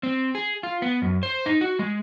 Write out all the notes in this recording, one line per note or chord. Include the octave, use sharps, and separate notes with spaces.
C4
G#4
F4
B3
F#2
C5
D#4
F#4
G#3